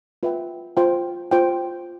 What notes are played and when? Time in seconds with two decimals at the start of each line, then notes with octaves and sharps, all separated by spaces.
0.23 F4 B4 E5 G5
0.77 F4 C5 G5
1.31 F4 C5 G5